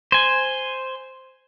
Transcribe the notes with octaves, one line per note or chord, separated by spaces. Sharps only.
C5 G#5